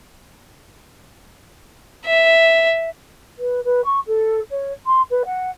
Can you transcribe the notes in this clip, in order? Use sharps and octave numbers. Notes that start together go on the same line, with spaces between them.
E5
B4
B4
C#6
A4
C#5
C6
B4
F#5